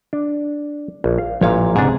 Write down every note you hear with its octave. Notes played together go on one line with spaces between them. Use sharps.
D4
A#1
F5
A1 A#2 F3 C#5 F5
C#2 G#2 C3 D4 G#4